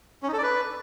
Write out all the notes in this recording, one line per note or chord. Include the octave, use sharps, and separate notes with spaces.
C#4
D#4
A4
D5
B4